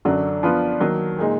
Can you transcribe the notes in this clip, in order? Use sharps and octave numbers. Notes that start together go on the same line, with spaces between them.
F#2 D3 F#3 D4 F#4
F3 B3 D4 F4 B4
D#3 F#3 A#3
A#2 G#3 D#4